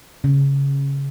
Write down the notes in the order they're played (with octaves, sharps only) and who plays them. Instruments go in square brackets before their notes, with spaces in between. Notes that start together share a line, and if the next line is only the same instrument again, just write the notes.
[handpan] C#3